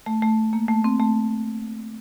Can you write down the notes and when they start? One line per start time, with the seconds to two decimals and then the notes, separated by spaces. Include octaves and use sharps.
0.06 A3
0.22 A3
0.53 A#3
0.68 A3
0.84 C4
0.99 A3